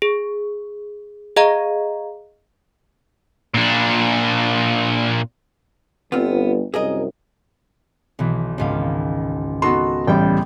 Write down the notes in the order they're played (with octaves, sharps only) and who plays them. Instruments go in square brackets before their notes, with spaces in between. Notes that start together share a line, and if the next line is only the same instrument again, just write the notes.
[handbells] G#4
G#4 D#5 F5 A#5
[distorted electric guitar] A#2 D4
[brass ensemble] G1 [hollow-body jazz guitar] B3 C4 F4
[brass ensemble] C2 F#2 [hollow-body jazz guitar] G#4 A#4 D#5
[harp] B1 E3
G#1 C#2 F5
[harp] B3 D#4 A4 [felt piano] F#4 C6
[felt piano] A1 G3 [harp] G5